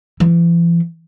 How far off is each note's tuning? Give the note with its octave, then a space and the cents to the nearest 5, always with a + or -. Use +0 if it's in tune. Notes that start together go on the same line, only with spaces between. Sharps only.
E3 +45